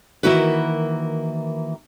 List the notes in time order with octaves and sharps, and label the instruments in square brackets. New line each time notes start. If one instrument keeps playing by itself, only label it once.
[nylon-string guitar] D#3 E3 A#3 E4 F#4 B4